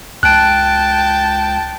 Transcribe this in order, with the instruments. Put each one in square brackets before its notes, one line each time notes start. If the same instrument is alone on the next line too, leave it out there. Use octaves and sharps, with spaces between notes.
[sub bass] C#2 [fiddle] G5 A5 [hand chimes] F#6 D7